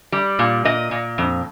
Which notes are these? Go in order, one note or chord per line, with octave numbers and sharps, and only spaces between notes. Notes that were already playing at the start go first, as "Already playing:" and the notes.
G3
A#2
A#2 D#5
A#2
F2